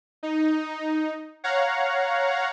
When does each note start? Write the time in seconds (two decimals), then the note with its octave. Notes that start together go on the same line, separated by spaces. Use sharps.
0.23 D#4
1.44 C#5 F5 F#5 A#5